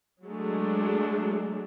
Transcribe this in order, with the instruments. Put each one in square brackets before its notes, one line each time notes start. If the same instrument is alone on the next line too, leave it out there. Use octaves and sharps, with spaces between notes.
[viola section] F#3 G#3 A3 D4